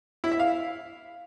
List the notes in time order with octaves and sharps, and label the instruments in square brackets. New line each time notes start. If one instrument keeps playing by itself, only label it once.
[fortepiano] E4
E5
F5